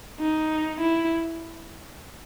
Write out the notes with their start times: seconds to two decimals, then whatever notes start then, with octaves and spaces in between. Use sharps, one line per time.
0.19 D#4
0.81 E4